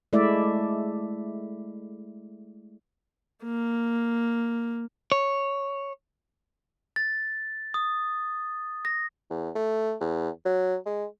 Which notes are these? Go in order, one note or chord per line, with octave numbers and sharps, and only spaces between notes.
G#3 A3 E4 D5 E5
A#3
C#5
A6
D#6
A#6
E2
A3
E2
F#3
G#3